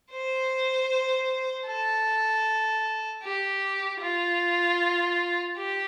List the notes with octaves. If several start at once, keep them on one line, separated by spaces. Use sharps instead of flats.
C5
A4
G4
F4
G4